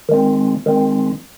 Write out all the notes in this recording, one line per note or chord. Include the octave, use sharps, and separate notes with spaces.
D#3 G#3 C4
D#3 G#3 C4